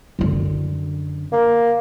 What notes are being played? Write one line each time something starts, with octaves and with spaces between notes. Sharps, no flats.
F#2 D3
A#3